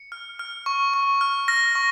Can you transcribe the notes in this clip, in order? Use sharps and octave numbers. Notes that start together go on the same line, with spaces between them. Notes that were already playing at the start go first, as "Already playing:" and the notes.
Already playing: C#7
F6
F6
C#6
C#6
F6
F6 A#6
C#6